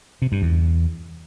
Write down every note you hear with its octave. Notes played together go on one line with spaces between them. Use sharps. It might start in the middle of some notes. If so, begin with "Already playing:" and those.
C3
G2
E2